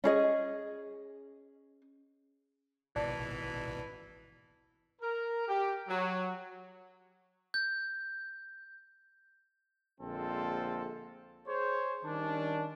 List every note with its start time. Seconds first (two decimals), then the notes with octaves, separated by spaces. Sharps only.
0.04 C#4 G#4 D#5
2.96 G#1 B2 E3 D5 A5
5.01 A#4
5.47 G4
5.88 F#3
7.54 G6
10.00 A#1 D3 G#3 C4 F4 A4
11.47 G#4 C5 C#5
12.03 D#3 G3 C#4 D4